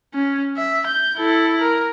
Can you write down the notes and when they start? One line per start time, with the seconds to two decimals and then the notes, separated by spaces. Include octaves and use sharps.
0.15 C#4
0.57 E5
0.87 G6
1.17 E4 A4
1.61 A#4